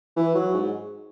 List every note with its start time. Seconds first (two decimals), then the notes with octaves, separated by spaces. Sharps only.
0.17 E3
0.35 F#3
0.54 G#2